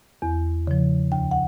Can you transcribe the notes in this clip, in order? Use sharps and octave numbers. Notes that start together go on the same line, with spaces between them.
E2
C#3 F3
D2 G5
F#5